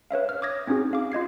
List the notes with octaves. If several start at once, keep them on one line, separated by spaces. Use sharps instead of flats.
B4 C#5 E5 F5
F6
D6 D#6 G#6 A#6
C4 C#4 D#4 F#4 G#4
F5 D6
F4 D#5 G#6 C7